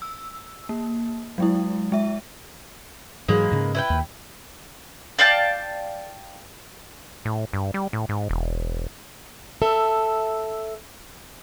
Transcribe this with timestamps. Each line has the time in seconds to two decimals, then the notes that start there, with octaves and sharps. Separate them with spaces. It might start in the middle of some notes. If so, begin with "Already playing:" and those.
0.02 E6
0.69 A#3
1.38 F#3 G#3 E4
1.92 G#3 E5
3.28 G#2 E3 F#3 G#3 A#3 B4
3.51 G#2 C#3
3.75 E4 B4 G5
3.90 D#2
5.19 D5 F5 G5 A5
7.25 A2
7.53 G2
7.74 G3
7.93 A2
8.09 G#2
8.29 E1
9.62 A4 E5